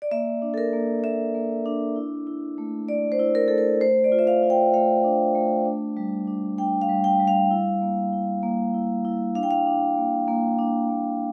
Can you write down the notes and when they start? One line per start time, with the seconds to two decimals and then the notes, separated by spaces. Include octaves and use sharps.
0.02 D5
0.11 A#3 E5
0.42 D4
0.54 A4
0.58 A#4
0.73 A#3
1.04 A#3 E5
1.35 A#3
1.66 D4
1.96 E4
2.27 E4
2.58 A3
2.88 A3 D5
3.12 C5
3.19 E4
3.35 A#4
3.48 A3 A4
3.58 A#4
3.81 A3 C5
4.04 D5
4.12 F4
4.19 E5
4.27 F5
4.43 F4
4.50 G5
4.74 A3 F5
5.04 D4
5.35 A3
5.66 D4
5.97 G3
6.27 D4
6.58 D4 G5
6.82 F5
6.89 G3
7.04 G5
7.20 G3
7.28 F5
7.51 E4
7.82 A#3
8.13 E4
8.43 A#3
8.74 E4
9.05 E4
9.35 D4 F5
9.43 G5
9.51 F5
9.66 D4
9.97 A#3
10.28 A#3
10.59 D4
10.89 A#3